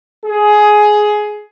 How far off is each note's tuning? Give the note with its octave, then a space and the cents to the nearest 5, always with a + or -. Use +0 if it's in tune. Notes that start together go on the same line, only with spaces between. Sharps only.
G#4 +15